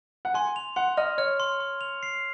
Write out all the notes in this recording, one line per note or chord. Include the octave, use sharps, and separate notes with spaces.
F#5
G#5 C6
F7
F#5 C6
D#5 F6
C#5 F6
C6
C6
F7
C7